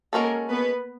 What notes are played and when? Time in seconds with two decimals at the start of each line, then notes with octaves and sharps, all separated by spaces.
0.13 G#3 A#3 C#4 F#4 A4 A#4
0.50 B3 B4